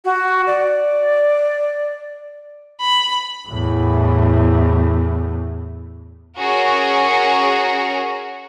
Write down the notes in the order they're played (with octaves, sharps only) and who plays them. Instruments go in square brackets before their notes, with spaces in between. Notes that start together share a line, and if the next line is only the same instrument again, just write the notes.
[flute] F#4
D5
[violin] B5
[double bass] E2 A2
[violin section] C#4 F#4 G#4 A#4